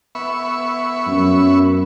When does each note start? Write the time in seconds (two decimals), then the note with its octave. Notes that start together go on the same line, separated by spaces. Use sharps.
0.15 B3 E5 C#6
1.07 F#2